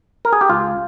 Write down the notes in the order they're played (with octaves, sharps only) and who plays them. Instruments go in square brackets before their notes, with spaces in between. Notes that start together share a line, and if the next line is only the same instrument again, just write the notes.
[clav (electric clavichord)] A#4
G#4
G4
C#2 F4